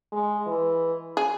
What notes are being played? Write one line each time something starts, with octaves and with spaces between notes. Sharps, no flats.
G#3
E3
G#4